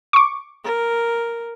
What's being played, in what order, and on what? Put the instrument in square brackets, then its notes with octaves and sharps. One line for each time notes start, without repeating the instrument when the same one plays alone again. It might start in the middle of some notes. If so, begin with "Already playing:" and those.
[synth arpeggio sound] C#6 D6
[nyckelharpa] A#4